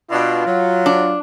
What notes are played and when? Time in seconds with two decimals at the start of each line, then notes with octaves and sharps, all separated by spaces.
0.10 B2 D4 F4
0.46 F#3
0.86 D4